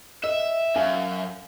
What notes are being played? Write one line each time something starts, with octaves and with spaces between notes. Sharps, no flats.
D#5 E5
F#2 E5 F5 G#5